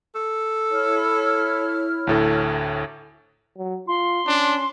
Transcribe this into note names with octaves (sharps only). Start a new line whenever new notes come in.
A4
E4 C#5 F6
D2 A2 A4
F#3
F4 C6
C#4 D4